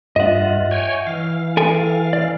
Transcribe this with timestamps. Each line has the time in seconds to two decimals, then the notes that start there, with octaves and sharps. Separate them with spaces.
0.16 G2 F4 D#5 E5 F#5
0.71 C#5 G5 G#5
1.07 E3 F5
1.57 A4 G5 G#5
2.13 D5